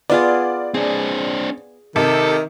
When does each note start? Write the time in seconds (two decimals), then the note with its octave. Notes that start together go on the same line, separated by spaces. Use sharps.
0.10 B3 F4 G#4 D5
0.74 C4 D4 G#4
1.96 C3 D#3 A4